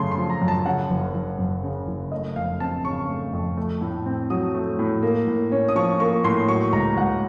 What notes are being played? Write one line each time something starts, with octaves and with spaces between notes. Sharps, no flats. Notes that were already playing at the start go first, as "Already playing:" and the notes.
Already playing: F#2 C#3 A3 C6
C6
F3
A#5
F#2
A5
C#3 F#5
F#1
F#1
F#2
C#3
F#1
A3 D#5
F2 F5
C4 A5
C#3 C#6
A3
F2
A3
A2
C4
F#3 D#6
A3
A2
A#3
A2
C#4
D#6
F3 C#6
A#3 C#6
A2 C6
F#3 C#6
C#2 A#5
C#2 F#5